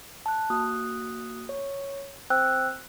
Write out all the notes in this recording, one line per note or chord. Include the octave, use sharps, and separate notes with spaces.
A5 F#6
A#3 F#4 D#6 F#6
C#5
C4 C5 G5 E6 F#6